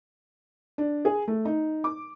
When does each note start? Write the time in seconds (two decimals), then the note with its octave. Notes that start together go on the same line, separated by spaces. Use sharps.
0.78 D4
1.05 G#4
1.28 A3
1.45 D#4
1.84 D6